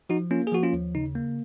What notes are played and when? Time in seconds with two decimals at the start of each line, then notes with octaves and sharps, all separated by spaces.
0.09 F3 D#4 F#4
0.31 A#3 C#4 F4
0.47 G#4
0.52 F3 F#4
0.63 C#4 F4
0.73 D#2
0.95 C#3 D#4
1.15 A#3